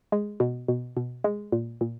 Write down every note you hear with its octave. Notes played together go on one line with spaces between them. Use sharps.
G#3
B2
B2
B2
G#3
A#2
A#2